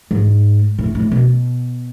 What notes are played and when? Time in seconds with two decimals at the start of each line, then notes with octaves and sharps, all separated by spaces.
0.11 G#2
0.79 A2
0.95 A2
1.12 B2